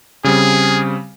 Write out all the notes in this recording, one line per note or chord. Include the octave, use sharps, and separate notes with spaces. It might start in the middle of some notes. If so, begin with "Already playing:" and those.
C#3 G3 C4 G#4